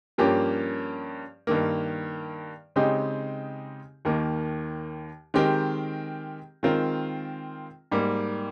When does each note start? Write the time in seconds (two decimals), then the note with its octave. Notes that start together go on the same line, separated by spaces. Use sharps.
0.18 G2 F3 A#3 C#4 G4
1.47 G2 D#3 A#3
2.76 C#3 G#3 C4 D#4 G4
4.05 D#2 D#3 A#3
5.34 D#3 G#3 C4 G4 A#4
6.63 D#3 G#3 C4 F4 A#4
7.91 G#2 G3 A#3